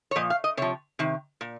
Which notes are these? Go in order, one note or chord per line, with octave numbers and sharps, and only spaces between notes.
C#5
A#2 F3 D#5
F5
D#5
C3 F3 C#5
C3 D#3
A#2